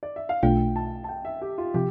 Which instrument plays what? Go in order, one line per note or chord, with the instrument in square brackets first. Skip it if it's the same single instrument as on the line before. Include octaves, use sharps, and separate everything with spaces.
[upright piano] D5
E5
F5
[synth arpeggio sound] B1 B2 A3 D4 F4 [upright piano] G5
[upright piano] A5
A5
G5
E5
G4
F4
[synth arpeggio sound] C3 F3 [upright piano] G4